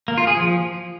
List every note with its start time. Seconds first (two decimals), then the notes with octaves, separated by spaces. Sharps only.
0.08 A#3
0.18 F4
0.27 G#4
0.37 F3